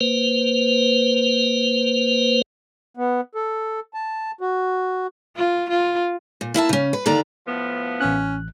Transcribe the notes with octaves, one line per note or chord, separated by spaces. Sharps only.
A#3 B4 C5
B3
A4
A5
F#4
F4
F4
A#2
A#3 E4 E5 A5
C#3 C#4
B4
D#2 D3 A#3 D5 A#5
A2 F3 B3
A1 C#4 F#6